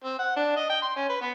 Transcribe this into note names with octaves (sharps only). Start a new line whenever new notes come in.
C4
F#5
D4
D#5
G5
C6
C#4
B4
B3